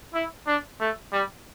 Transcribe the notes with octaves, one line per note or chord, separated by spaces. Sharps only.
E4
D4
A3
G3